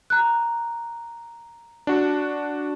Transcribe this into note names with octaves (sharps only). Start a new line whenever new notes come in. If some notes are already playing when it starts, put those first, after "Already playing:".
A#5 F#6
D4 F#4